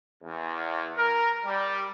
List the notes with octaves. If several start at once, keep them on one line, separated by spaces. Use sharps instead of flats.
E2
A#4
G3